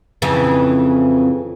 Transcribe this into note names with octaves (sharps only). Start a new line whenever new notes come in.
F2 C#3 E3